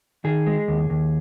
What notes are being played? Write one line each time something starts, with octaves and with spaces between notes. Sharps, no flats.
D#3 G#4
G#3
D#2
D#2